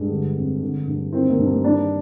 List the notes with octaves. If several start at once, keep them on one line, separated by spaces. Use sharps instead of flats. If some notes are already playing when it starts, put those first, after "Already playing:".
Already playing: G2 G#3
D3
F2
D3
G2
D#3 C4
A#3
G2
A#3
D#3 D4